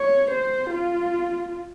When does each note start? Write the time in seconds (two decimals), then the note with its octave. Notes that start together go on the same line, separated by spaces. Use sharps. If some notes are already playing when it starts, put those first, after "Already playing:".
Already playing: C#5
0.31 C5
0.70 F4